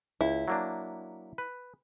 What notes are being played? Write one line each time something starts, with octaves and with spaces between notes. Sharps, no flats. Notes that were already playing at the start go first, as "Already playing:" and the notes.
C#2 E4
F#3 A#3 D4
B4